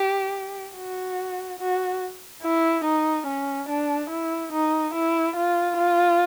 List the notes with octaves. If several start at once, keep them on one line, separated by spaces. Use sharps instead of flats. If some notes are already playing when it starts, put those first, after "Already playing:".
Already playing: G4
F#4
F#4
E4
D#4
C#4
D4
E4
D#4
E4
F4
F4